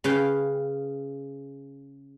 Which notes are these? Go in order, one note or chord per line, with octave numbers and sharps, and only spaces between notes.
C#3 B4 F5 G5